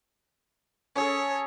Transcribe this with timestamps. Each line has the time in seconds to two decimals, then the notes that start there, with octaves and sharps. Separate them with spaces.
0.96 C#4 G#4 A4 C#5